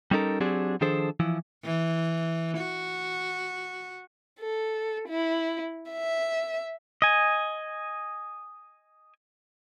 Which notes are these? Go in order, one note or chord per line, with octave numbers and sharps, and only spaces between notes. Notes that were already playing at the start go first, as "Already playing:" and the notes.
G3 C#4 D#4 A4 A#4
F#3 C4 D4 G4 G#4
D#3 F3 D4 G#4 A4 C5
E3 F3 E4
E3
F#4
A4
E4
E5
D#5 G#5